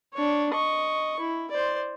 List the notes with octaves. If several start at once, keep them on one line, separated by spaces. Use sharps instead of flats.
D4 C#5
D#5 C#6
E4
C5 D5